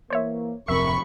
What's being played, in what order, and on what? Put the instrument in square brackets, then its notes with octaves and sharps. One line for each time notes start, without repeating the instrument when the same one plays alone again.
[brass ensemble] E3 A#3 [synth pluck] C5 C#5 E5
[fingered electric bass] D1 F2 C3 [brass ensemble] A#4 [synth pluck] E5 [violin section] B5 C#6